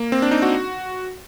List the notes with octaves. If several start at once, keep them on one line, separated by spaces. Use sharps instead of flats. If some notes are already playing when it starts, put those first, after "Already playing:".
Already playing: A#3
C4
D4
D#4
F#4